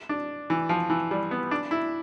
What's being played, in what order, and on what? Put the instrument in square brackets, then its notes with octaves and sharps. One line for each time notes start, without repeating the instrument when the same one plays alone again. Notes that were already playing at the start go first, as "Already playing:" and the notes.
[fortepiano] D4
E3
F3
E3
G3
B3
D4
E4